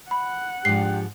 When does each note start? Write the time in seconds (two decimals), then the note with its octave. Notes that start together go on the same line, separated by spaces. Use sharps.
0.11 F#5 B5
0.65 G#2 F3 D4 G4 G5 C7